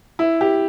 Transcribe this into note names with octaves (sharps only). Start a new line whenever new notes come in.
E4
G4